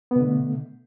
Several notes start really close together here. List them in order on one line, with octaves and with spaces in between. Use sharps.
B3 B2 D3 A3